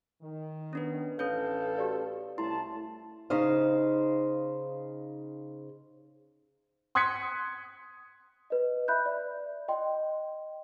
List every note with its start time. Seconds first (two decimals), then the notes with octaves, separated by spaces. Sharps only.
0.22 D#3
0.73 B3 C#4 D4 B4
1.19 A1 C#4 A4 B4 C#5 F5 G6
1.78 F#4 G4 D5
2.38 C2 A3 C#4 E4 A5 C6
3.30 C#3 D#4 C5 F5
6.95 C6 D#6 F#6 G#6 B6 C#7
8.50 B4 D#5
8.88 E5 B5 F#6 G6
9.06 D5
9.68 D#5 G5 C6